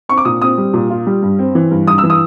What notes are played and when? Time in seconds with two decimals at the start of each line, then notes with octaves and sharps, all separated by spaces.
0.09 C4 C#6
0.18 D6
0.25 A#2 D#6
0.41 C4 D#6
0.58 G3
0.74 A#2
0.90 F4
1.07 G3
1.23 G2
1.39 C4
1.55 E3
1.71 G2
1.87 G2 D#6
1.98 E6
2.04 E3
2.10 D#6